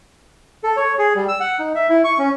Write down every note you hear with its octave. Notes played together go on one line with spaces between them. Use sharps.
A4
C#5
G#4
G3
E6
F#5
D#4
E5
E4
C#6
C#4